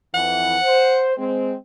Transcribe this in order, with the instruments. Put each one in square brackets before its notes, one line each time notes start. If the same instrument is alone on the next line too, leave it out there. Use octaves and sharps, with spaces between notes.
[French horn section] F2 E3 [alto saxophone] F#5
[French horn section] C5
G#3 C4